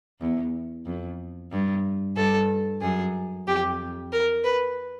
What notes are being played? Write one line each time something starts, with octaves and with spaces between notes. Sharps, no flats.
E2
F2
G2
G2 A4
F#2 G#4
F2 G4
A#4
B4